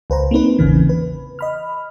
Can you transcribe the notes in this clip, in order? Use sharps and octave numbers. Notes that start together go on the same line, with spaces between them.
C#2 B4 C5 A#5
A#3 C4 D#4 B4
A1 E2 C#3 E3
B4
D#5 B5 F6